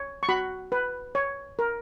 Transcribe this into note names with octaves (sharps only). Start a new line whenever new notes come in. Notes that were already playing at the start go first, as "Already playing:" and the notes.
Already playing: C#5
C#6
F#4 B5
B4
C#5
A#4